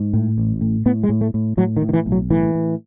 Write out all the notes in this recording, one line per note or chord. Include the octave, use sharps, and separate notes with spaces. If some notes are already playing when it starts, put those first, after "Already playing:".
Already playing: G#2
A2
A1
A2
A2 B3
G#3
A2
A3
A2
A2 F#3
D#3
A2
D#3
E3
B1
F#3
A2 E3
A2